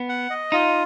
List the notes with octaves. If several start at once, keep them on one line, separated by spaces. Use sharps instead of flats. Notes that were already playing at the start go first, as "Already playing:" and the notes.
Already playing: B3
F#5
D#5
D#4 F4